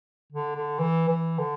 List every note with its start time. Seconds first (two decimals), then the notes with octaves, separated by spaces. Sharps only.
0.32 D3
0.55 D3
0.79 E3
1.09 E3
1.39 D3